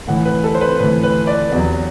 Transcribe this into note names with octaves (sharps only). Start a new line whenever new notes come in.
A2 E3 F#5
B4
A4
C5
B4
A2 E3 B4
B4
D5
E2 C3 F#3